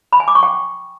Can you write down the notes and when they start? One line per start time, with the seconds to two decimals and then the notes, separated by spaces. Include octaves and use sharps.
0.13 B5
0.20 G#5
0.28 D6
0.35 C#6
0.43 G5